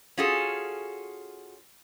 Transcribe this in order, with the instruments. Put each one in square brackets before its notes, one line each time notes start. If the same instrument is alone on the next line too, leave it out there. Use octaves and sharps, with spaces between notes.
[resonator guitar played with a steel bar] C#4 F4 F#4 G#4 A4